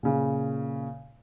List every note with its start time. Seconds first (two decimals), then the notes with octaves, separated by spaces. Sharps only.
0.03 A#2 C#3